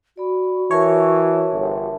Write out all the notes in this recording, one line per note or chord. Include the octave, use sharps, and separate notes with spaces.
F#4 D5 B5
E3 A#4 C#5 E5 A5
G1